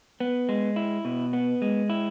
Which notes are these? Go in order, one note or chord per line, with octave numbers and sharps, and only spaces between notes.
B3
G#3
E4
B2
B3
G#3
E4